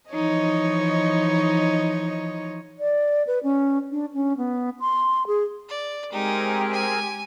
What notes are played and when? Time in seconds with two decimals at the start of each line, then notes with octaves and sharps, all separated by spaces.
0.11 E3 F3 D#4 C#5 D#5
2.79 D5
3.27 B4
3.43 C#4
3.92 D4
4.14 C#4
4.37 B3
4.80 C6
5.27 G#4
5.69 D5
6.13 G#3 C4 D#4 G4 G#4 A#4
6.74 G#5